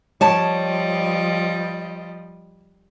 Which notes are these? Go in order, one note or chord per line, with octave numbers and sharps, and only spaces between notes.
F3 G3 C#5 D#5 A5